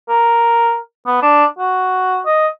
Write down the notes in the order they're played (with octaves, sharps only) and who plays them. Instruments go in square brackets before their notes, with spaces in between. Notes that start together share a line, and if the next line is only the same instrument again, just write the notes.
[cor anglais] A#4
B3
D4
F#4
D#5